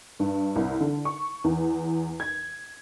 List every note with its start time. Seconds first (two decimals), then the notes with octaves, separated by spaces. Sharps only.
0.20 G2
0.56 C2
0.81 D3
1.05 C#6
1.44 E2
2.20 G#6